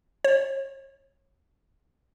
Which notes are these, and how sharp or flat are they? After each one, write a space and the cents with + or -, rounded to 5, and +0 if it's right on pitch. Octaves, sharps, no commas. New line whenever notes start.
C#5 -30